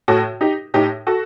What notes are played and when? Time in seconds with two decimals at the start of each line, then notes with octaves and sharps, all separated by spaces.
0.08 A2 F#4 A4
0.41 D#4 G4
0.74 A2 D#4 G4
1.07 F#4 A4